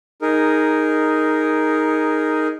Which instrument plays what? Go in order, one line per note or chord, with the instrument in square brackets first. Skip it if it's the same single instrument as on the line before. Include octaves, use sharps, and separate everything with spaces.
[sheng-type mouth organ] D#4 G#4 A#4